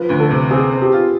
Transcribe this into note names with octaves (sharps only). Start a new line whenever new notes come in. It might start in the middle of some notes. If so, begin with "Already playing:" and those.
Already playing: F3 B4
D2
A4
C3
C4 G#4
C4
G4
F4